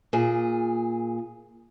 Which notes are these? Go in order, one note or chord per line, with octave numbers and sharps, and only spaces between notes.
A#2 G#4